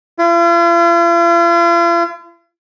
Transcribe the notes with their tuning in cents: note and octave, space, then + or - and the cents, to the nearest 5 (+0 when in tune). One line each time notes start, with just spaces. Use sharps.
F4 -45